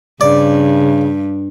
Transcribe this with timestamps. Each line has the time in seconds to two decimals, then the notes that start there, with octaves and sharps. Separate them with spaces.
0.21 G2 C#3 D5